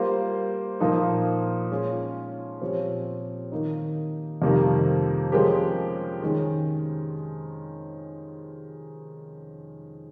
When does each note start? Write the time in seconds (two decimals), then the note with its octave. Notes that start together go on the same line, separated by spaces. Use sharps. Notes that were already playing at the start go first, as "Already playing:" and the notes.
Already playing: G3 A#3 F4 C5
0.80 A#2 F3 A#3 D#4
1.71 G#3 C#4 F4
2.61 A#2 F3 C4 G4 C#5
3.52 D#3 A#3 D#4
4.42 F2 C3 D#3 G3 A#3
5.32 F3 G#3 C#4 G4 A#4
6.22 D#3 G#3 C#4